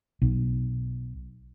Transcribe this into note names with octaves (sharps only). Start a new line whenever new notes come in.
B1